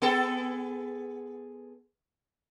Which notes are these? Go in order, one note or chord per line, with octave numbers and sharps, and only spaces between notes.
B3 G#4 A4